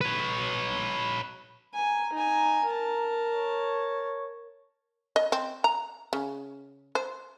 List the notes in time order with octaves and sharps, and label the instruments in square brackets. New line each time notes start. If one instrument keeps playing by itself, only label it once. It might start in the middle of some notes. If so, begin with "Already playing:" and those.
[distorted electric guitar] B4 C#5
[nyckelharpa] G#5 [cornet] A#5
[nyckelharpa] D#4 G#5
A#4 A5
[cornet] C#5
[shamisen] D#5
C4
A#5
C#3
C5